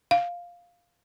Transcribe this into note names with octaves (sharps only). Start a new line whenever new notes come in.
F5